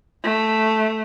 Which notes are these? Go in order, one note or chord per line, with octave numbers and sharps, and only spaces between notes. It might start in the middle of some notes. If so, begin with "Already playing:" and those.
A3